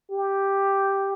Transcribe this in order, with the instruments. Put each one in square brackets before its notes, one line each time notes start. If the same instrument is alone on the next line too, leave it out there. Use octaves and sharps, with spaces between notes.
[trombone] G4